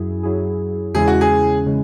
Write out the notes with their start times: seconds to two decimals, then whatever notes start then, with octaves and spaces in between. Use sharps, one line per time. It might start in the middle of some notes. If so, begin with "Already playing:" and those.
Already playing: F#2 F#3 E4 G#4
0.23 F#2 F#3 E4 G#4
0.94 E2 C#3 G#3 C#4 E4 G#4
1.08 F#4
1.21 G#4
1.66 C#3 G#3